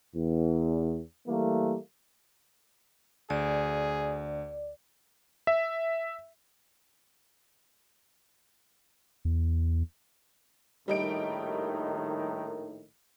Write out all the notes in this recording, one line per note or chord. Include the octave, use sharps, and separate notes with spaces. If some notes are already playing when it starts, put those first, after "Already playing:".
E2
E3 G3 A3 A#3
D2 G#4 D5
E5
E2
A#1 A2 D#3 G3 D#4 D7